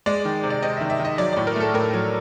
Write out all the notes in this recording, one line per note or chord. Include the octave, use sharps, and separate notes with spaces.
G#3 D5
D#3
C3
D5
C3 D#5
E5
D#3
E5
D#3
D#5
F#3 D5
A2 D5
A#4
A3 A4
A2 A#4
F#3